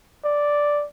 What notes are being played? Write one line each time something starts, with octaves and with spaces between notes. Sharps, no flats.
D5